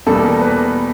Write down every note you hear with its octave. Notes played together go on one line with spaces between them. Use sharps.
E2 B2 G3 A#3 A4
A#4
B4